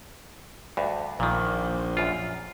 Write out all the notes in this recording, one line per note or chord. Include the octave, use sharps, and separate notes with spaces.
D2 G2
A#1 A#2 D#3
F#2 F4